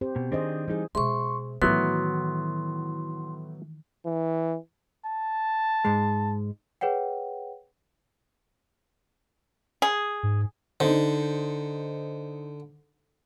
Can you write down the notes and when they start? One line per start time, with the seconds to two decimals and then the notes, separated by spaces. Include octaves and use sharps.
0.01 C4 G4 C5
0.16 B2
0.32 D#3 C4 D4 G#4 C5 D#5
0.68 E3 G3 D#4 G#4
0.95 B2 G#3 G#4 C5 E5 C6 C#6
1.62 A2 D#3 E3 F#3 B3 F#4 E5 C6
4.06 E3
5.06 A5
5.85 G#2 G#3
6.81 G#4 B4 C#5 F#5 G5
9.82 G#4
10.23 G#2
10.80 D3 D#4 C5